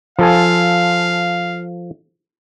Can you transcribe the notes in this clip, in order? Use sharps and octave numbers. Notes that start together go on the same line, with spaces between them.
F3 A4 F5 G#5